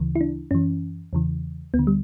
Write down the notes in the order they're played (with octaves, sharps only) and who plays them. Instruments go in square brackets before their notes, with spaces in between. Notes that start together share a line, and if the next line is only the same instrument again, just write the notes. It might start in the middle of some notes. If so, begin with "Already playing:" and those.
Already playing: [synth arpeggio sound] D2 C#3 E3
E4
D4
F#2 E3 C#4
E2 C#3 E3
D2 B3
D3
G3